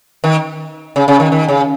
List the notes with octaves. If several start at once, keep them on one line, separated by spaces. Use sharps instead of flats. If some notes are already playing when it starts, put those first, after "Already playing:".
D#3
C#3
C#3
D#3
D#3
C#3